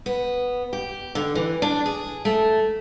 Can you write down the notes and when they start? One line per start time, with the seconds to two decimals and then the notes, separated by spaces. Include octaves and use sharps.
0.06 B3
0.73 G4
1.15 D3
1.35 E3
1.62 D4
1.86 G#4
2.25 A3